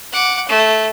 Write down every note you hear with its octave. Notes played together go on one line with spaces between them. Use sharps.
F#5 D6
A3